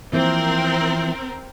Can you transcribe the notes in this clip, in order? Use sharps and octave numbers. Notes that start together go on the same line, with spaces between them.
E3 F3 A#3 C4 A#4